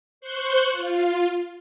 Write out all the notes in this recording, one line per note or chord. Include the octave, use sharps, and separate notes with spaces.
C5 C6 C#6 F#6 G6
F4